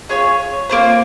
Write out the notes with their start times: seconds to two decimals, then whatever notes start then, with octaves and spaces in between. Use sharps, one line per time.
0.09 C#4 F4 G#4 C#5
0.69 A#3 F4 C5